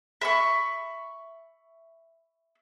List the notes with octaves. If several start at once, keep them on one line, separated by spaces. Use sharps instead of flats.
E5 B5 C#6